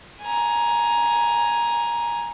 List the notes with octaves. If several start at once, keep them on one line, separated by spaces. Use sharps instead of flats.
G#5 A#5